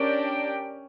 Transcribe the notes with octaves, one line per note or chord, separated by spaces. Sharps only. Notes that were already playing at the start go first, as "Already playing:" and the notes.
Already playing: C#4 D4 G4 A#4 D5 G5